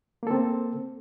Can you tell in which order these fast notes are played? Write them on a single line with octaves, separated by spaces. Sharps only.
A#3 A4 C4